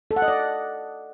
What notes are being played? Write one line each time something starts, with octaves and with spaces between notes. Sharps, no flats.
A4
F#5
D#5
D5